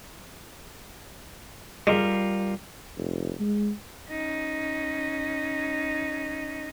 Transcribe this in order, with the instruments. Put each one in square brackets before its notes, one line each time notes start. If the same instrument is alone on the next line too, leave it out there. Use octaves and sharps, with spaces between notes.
[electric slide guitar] G3 F4 A#4 [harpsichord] G#3
[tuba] F1
G#3
[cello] C#4 D#4